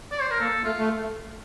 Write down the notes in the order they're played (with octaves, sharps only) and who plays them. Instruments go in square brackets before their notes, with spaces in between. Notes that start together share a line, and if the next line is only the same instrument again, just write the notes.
[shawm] D5
C5
A#4
[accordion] A#3 [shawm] A4
[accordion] A3 [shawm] F4
[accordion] A3